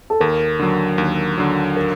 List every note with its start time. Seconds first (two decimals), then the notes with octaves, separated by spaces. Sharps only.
0.10 A4
0.20 D#2 A#4
0.59 D3 F#3
0.98 D#2
1.38 D3 F#3
1.77 A#4